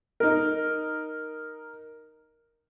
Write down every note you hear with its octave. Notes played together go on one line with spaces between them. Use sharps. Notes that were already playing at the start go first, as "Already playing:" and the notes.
D#4 A#4